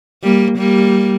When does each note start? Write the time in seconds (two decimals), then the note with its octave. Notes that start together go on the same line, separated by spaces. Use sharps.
0.24 G3 A#3
0.58 G3 A#3